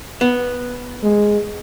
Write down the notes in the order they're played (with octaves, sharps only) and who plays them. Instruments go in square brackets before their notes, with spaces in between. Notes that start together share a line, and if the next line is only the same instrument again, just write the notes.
[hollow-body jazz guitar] B3
[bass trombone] G#3